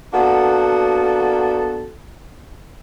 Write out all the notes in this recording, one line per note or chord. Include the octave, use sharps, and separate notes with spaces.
A#3 B3 D4 F#4 A4